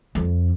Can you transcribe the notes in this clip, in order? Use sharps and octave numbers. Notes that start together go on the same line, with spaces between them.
F2